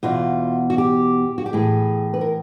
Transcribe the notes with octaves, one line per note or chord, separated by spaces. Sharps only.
E2 B2 F4
F#4
G4
F#4
G4
A2 E3 G#4
B4
A#4